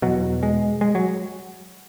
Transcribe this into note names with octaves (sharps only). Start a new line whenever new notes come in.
E2 B2 F#3
G#3
G#3
F#3